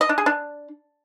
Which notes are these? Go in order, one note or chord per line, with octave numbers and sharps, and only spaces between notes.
D#5
D4
G#4
D4